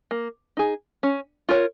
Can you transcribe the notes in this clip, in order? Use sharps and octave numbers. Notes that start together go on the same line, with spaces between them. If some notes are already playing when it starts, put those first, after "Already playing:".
A#3
D#4 G#4
C#4
F4 A#4 C#5